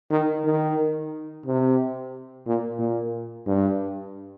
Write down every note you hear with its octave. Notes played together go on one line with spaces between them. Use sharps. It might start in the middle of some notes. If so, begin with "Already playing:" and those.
D#3
D#3
C3
A#2
A#2
G2